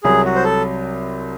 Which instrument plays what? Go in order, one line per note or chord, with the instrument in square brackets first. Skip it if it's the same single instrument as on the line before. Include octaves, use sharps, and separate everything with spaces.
[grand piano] C2 C3 F#3 [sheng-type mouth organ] G#4
[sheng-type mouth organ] F#4
C5
A4